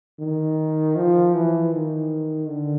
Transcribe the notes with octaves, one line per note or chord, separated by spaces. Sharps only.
D#3
F3
E3
D#3
D3